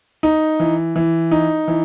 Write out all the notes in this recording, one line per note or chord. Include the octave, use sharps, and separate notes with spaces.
D#4
E3
E3
D#4
E3